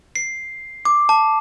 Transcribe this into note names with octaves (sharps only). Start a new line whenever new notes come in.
C7
D6
A5